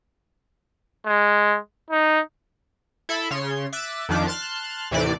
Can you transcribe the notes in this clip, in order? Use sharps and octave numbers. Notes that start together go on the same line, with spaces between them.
G#3
D#4
E4 A4 E5 B5
C#3 C#5 C6
E5 D6 E6 F#6 A6 D#7
F2 D#3 F3 D4 D6 B6
A5 C6 F6 F#6
D#2 A2 C3 E3 D5 D6